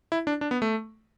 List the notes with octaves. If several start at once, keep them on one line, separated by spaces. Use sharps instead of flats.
E4
D4
D4
B3
A3